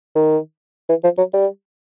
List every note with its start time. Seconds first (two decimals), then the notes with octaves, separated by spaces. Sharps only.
0.16 D#3
0.89 E3
1.04 F3
1.18 F#3
1.33 G3